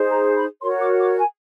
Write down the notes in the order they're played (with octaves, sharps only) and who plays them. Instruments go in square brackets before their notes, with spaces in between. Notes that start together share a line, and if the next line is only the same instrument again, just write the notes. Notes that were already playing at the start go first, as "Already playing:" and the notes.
Already playing: [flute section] D#4 G#4 C5
A#5
B5
F#4 A#4 C#5 C6
D6
D6
G#5